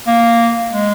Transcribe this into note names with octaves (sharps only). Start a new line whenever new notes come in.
A#3
G#3